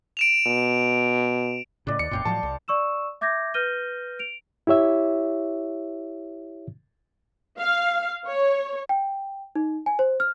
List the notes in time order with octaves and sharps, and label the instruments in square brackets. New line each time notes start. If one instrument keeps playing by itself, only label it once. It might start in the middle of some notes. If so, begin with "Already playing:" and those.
[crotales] D7 E7 F7
[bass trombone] B2
[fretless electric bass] A2 C#3 [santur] B4 D5 D#5
[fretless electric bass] D#2 [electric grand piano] C#7
[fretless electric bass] E1 F#2 A#2 [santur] F5 G5 C6
[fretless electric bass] A2 F3 F#3 [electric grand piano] A5 [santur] C6
[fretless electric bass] C2
[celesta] D5 C#6 E6 E7
E5 D6 G6 G#6 A#6
B4 F6 G6 A#6 D#7 G7
D7 F7
[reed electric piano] E4 G4 C#5 E5
[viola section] F5
C#5
[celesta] G5
D#4
G#5
C5
F6